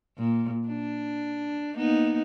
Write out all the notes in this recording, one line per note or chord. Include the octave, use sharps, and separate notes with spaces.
A#2
D4
A#3 B3 D#4